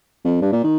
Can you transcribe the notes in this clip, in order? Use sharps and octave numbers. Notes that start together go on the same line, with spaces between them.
F2
G2
A#2
D#3